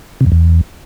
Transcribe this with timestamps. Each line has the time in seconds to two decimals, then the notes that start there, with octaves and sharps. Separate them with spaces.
0.21 C3
0.26 F2
0.32 E2